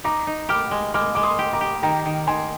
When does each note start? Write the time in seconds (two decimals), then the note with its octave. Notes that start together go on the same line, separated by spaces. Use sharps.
0.04 D#4 A#5 D6
0.27 D#4
0.49 G4 D6 F6
0.71 G#3
0.94 G#3 D6 F6
1.15 G#3 D6
1.23 C6 D#6
1.39 G4
1.53 A#5 D6
1.61 G4
1.83 D#3 G5 A#5
2.05 D#3
2.27 D#3 G#5 C6